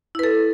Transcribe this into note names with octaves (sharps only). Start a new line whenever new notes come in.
E4 A4 B4